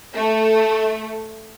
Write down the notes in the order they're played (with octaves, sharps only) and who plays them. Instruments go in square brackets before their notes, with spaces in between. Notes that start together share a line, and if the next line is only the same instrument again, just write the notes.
[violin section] A3